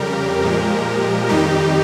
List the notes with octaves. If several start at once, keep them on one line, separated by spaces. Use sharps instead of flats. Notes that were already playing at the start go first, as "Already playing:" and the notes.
Already playing: F2 C#3 G3 G4 A#4
A#2 F3 G#3
F2 D#3 G3 D#4 G4